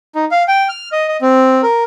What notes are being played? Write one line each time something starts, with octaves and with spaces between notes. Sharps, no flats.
D#4
F5
G5
F6
D#5
D#5
C4
A#4